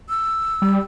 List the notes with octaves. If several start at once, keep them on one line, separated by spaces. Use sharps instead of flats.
E6
G3